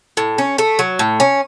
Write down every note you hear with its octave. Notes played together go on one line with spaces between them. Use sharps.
A2
C#4
A3
F#3
A2
C#4